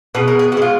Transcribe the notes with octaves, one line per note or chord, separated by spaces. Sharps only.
B2 G#3 B4
A#4
G#4
B2 G#3 F4 F#4